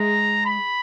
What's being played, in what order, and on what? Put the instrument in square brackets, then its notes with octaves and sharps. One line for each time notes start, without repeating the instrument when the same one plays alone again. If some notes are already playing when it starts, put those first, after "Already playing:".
Already playing: [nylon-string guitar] G#3 [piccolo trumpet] A#5
[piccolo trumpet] B5